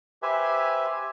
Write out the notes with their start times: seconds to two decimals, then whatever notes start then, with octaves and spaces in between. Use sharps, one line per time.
0.23 G4 B4 C5 E5 G#5